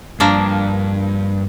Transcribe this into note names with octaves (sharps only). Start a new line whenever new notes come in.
G2 F3 A#3 D4